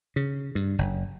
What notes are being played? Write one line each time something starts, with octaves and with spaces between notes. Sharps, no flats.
C#3
G2
F#1